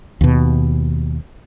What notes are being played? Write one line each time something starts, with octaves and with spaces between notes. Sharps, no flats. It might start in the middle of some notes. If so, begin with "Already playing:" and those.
D#2 B2